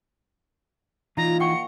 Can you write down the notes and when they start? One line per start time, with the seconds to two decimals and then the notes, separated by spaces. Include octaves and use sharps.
1.17 A#2 E3 D#4 F4 A#5
1.40 F#5 G5 C#6 C#7